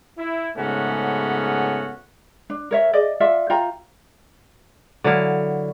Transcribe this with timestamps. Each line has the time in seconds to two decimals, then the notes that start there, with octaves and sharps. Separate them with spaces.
0.17 E4
0.56 G#2 C#3 A3 B3 C#4 F#4
2.50 D4
2.71 A#4 C#5 E5
2.93 G#4 D5 D#5
3.20 F4 D5 E5
3.50 F4 G5 A#5
5.04 D3 F#3 E4 F5